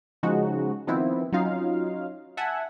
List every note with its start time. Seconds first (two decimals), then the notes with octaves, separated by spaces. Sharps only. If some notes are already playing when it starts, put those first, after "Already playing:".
0.23 C#3 F3 G#3 D#4 F#4
0.87 D#3 F3 B3 C4 E4
1.32 F#3 C#4 D#4 F4 F5
2.37 E5 F#5 G#5 A5